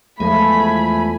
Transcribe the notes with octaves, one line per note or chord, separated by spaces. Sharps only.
E2 F3 G#3 A3 G#5 B5